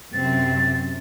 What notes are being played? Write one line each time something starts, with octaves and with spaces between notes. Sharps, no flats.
F#2 C3 C4 A6